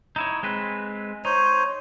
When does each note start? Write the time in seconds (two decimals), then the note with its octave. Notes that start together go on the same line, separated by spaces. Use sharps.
0.16 D#4 E4 C#5
0.43 G#3 C4 B4
1.25 D#4 C5 C#5